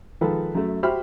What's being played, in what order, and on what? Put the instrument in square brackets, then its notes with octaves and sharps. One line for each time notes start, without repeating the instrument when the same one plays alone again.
[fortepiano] D#3 F3 G#3 A4 B4
F#2 A3
F#4 G4 C5 E5 B5 F6